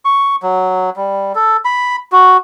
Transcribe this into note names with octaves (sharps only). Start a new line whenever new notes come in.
C#6
F#3
G3
A4
B5
F#4